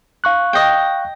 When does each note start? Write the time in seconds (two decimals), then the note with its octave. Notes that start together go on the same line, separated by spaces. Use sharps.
0.24 F5 C#6 F#6
0.53 D#5 G5